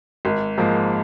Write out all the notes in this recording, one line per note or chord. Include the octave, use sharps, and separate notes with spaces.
G#1
G#2 F3 A#3